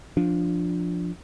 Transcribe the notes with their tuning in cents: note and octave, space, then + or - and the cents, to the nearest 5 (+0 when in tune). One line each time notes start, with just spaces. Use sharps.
F3 +0 D4 +0